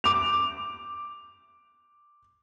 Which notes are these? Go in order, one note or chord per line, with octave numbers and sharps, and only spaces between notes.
D6 F7